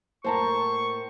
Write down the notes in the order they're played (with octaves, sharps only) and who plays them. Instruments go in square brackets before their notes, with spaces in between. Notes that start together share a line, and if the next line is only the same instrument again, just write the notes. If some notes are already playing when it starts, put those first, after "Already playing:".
[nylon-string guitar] A2 A#3 [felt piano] C5 A5 A#5 [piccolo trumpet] C#6